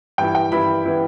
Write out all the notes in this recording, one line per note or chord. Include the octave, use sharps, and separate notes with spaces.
G2 E3 B3 E4 G5
G5
G2 E3 B3 E4 B5
E3 B3 E4